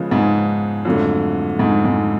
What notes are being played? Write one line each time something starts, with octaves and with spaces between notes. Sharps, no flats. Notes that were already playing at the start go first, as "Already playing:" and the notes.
Already playing: C#3 F3 G#3 B3
G#2
F2 D3 F#3 A3
G#2
G#2